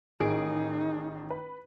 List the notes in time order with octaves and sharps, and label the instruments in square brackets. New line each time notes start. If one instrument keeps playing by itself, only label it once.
[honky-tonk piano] A1 G#4 D7 [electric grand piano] D#3 [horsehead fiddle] D#4
[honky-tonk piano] B4